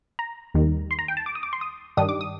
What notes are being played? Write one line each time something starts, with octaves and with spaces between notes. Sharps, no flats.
A#5
D#2 D#3 G3
C6
A#5
G5
A5
D6
D#6
D6
C6
D#6
G2 D#3 G3 D4 D#6
D6
D#6